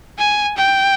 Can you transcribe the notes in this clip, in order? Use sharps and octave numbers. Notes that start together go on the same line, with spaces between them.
G#5
G5